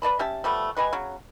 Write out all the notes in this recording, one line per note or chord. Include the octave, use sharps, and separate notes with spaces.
B4 D5 A5 B5
C#4 G4 E5 A5
F3 G3 A3 B3
G3 B4 D#5 G#5
C#3 F#3